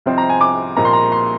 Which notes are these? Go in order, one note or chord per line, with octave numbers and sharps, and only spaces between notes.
C2 C3 F3 C4 D#4
A#5
G#5
D6
C2 A#2 F3 A#3 D#4 A#5
C6
A#5
C6